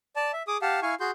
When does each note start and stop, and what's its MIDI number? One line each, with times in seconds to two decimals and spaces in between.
0.16 0.32 74
0.16 0.32 81
0.33 0.43 76
0.48 0.57 68
0.48 0.57 86
0.48 0.57 87
0.62 0.80 67
0.62 0.80 77
0.62 0.80 78
0.62 0.80 81
0.82 0.95 64
0.82 0.95 77
0.82 0.95 80
0.82 0.95 85
1.00 1.11 66
1.00 1.11 68
1.00 1.11 84
1.00 1.11 91